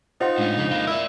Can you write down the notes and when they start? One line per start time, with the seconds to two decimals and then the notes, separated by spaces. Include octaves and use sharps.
0.21 D#4 F4 C5 F#5 C6
0.38 A2 G#3 C#4
0.58 F2 C#3
0.71 G#3 A#3 F5
0.87 E4 A#4 D5